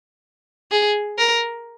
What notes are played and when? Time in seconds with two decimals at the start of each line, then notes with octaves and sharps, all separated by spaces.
0.72 G#4
1.18 A#4